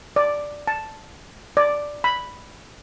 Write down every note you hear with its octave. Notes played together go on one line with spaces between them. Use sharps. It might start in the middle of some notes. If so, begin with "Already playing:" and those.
D5
A5
D5
B5